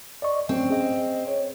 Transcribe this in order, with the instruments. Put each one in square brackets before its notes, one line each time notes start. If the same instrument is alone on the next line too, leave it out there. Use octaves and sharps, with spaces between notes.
[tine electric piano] D5 D#5 C#6
[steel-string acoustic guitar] C4 [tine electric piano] C#4
[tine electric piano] G#4 D#5
C#5